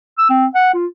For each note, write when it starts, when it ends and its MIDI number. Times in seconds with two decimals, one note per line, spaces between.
0.18 0.26 88
0.30 0.46 60
0.55 0.73 78
0.74 0.86 65